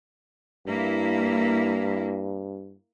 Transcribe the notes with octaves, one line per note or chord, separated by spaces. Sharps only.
G2 A#3 E4